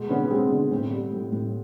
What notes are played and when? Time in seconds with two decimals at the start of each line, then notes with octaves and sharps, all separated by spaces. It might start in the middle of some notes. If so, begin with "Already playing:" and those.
Already playing: B2 G#3
0.09 D3 B3 C#4
0.25 B3
0.30 G#3 C4
0.50 D3
0.71 A2 C4
0.92 G3
1.12 A2
1.32 A2